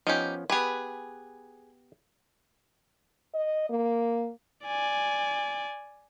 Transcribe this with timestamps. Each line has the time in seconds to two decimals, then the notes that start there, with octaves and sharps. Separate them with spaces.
0.07 F3 B3 C#4 D#4 G4
0.50 B3 G4 G#4 B4 G#5
3.35 D#5
3.70 A#3
4.66 D5 G#5